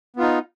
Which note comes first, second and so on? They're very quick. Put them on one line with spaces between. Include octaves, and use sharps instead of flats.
B3 F4 D#4